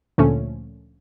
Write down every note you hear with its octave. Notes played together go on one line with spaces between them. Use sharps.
D2 A#2 D3 F3 A3 C#4